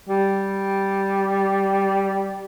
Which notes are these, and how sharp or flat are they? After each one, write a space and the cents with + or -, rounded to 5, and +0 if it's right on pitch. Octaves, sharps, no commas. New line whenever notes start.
G3 -5